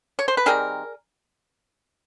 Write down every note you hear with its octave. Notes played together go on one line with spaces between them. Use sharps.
C#5
C5
B4
D#3 G3 C4 G#4 A#4